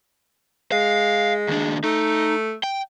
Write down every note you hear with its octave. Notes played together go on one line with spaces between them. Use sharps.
G#3 F5
D#2 D4
A3 D#4
G5